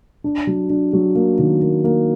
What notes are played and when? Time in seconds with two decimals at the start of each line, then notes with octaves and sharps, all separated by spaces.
0.24 D4
0.47 F#3
0.70 D4
0.93 F#3
1.15 A#3
1.39 D#3
1.61 A#3
1.84 A#3